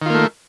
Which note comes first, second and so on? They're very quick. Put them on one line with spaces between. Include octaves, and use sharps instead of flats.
D#3 F4 A#3 A3